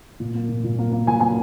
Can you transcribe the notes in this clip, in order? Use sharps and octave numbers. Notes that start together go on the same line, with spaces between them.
A#2
A#3
A#2
A#2
A#3
A#3
A#2 G#5
A#3 G#5